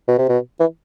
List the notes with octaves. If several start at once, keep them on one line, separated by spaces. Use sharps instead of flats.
B2
C3
B2
E3